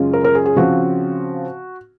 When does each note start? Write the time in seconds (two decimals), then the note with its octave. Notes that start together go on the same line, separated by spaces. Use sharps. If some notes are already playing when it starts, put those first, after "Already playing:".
Already playing: F#2 C#3 G#3 C#4 F4
0.13 A#4
0.24 A#4
0.35 G#4
0.45 G#4
0.56 C#3 F3 C4 F#4